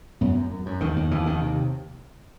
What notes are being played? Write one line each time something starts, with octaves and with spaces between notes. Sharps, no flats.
F#2 B3
F#2
F#2
F#2
D#2 D#3
D#2
D#2 E3
D#2 D#3
C3